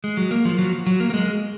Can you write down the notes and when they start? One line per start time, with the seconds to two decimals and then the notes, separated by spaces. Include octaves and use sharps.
0.04 G#3
0.17 F#3
0.31 A#3
0.45 F3
0.59 F#3
0.86 F#3
1.00 A#3
1.10 A#3
1.14 G#3